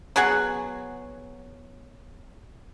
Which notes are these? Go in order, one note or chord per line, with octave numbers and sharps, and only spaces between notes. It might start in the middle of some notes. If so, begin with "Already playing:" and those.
F#3 B3 G#4 F#5